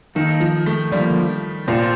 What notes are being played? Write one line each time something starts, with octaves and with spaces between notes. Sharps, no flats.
D#3 A#3 D#4 A4
F3
A3
D3 F3 G3 A#3
A#2 C4 F4 A4 C5